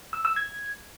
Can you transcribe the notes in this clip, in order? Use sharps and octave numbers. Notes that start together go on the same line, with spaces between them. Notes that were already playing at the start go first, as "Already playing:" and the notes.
E6
E6
G#6